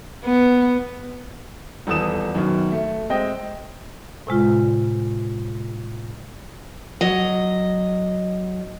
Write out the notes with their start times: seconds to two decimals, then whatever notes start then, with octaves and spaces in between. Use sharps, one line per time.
0.24 B3
1.87 D#1 E2 A4 D#6 E7
2.35 F#2 B2 D#3
2.72 A3
3.10 G#3 C4 D#5 G5
4.27 A2 C3 G#3 F4
7.01 F#3 D#5